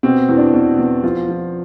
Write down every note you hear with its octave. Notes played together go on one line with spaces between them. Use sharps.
B2 C4
E2
D4
B2
E2
F3 F4
F3